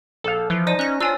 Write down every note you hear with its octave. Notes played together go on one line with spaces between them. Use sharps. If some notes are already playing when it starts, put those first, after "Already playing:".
A#1 A4 F5
E3 F3
D#4 C5 D5 D#7
C#4 F#6 A#6
D4 F4 C#5 G#5 E6